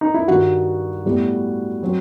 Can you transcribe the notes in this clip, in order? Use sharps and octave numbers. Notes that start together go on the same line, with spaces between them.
D#4
E4
G2 D#3 G3 F#4
A2 G3 B3
F#3 C4